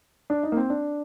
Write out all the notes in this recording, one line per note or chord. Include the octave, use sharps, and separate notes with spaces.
D4
D#4
A#3
C4
D4